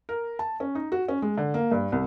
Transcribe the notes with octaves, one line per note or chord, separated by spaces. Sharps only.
A#4
A5
C#4
D#4
F#4
C#4
G#3
D3
A#3
G2
C2